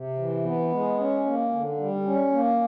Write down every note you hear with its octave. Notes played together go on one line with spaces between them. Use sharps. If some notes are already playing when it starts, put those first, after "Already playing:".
Already playing: C3
E3
B3
G#3
C#4
A#3
D3
G3
C#4
A#3